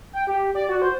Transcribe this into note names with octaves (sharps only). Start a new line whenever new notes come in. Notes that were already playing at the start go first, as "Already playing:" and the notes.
G5
G4
D5
F#4
C5